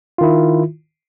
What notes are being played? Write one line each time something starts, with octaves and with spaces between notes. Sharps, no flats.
D#3 E4 F4